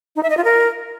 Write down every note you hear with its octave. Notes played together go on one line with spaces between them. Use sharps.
D#4
E5
D#5
F4
A#4